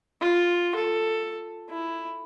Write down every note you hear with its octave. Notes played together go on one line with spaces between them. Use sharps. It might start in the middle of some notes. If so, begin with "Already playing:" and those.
F4
A4
E4